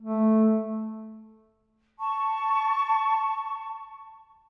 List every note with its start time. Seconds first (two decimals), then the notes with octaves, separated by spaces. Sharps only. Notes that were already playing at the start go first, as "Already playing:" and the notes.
0.02 A3
1.98 A5 C#6